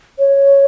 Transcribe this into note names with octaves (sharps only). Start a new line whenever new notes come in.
C#5